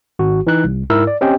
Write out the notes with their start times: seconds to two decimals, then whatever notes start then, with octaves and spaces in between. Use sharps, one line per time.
0.19 G#1 F#4
0.47 E3 D#4 F#6
0.64 C2
0.90 G#2 E4 A#4 E6
1.07 D5
1.21 C4 C#4 G4 D#5 G5